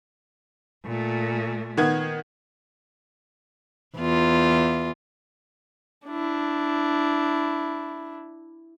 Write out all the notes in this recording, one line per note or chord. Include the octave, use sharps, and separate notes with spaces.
A#2 A3
D#3 B3 G#6
E2 F4
D4 E4